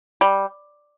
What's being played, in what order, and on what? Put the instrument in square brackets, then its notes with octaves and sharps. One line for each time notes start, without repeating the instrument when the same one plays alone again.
[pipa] G3